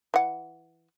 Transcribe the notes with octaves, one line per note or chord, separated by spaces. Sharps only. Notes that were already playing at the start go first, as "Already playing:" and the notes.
E3 F#5